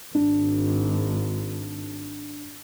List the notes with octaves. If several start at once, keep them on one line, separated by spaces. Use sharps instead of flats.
G#1 D4